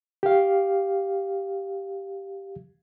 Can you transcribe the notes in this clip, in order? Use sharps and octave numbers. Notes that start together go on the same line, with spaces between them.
G4 F5